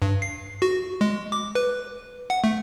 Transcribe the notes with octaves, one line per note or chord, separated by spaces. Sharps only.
G2
C7
F#4
G#3
D6
B4
F#5
A3